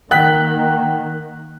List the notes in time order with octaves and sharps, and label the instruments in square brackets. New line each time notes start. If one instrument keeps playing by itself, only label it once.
[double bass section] D#3 A#3 [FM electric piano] F#5 G5 [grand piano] F#6 B6